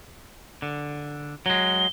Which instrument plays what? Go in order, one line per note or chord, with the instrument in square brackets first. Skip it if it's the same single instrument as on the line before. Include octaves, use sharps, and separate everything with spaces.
[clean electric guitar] D3
[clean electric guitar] F#3 G#3 [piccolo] G7